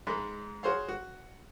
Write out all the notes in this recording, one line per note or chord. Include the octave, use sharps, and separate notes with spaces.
G#2 G#3 B5
F#4 G#4 C5 C#5 F5
F#4